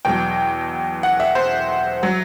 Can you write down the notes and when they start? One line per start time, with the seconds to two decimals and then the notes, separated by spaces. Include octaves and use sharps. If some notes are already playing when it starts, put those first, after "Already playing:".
0.05 E2 B2 F#3 G5
1.03 F#5
1.20 E5
1.35 C5
2.03 F#3